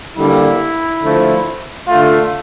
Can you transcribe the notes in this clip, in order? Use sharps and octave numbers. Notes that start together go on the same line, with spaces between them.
D3 G3 A#3 E4
D3 F3 A3
D3 A3 F4